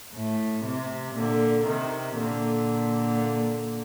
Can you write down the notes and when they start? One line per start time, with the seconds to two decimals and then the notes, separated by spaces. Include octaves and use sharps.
0.14 A2
0.65 C3
1.17 A#2 D3
1.67 C3 D#3
2.19 A#2 D3